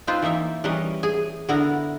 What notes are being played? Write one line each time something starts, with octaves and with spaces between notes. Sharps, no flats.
C4 D#4 F4 B4 C5
E3 A#3 D#4 E5
E3 G3 C#4 A#4 B4 D#5
G#4
D3 B3 E4 A#4 A#5